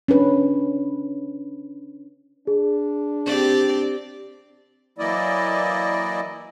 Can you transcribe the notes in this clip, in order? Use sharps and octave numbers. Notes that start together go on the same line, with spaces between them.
C#4 D4 B4
D4 G#4
C4 G4 D5
E3 F#3 A#3 E4 D5 D#5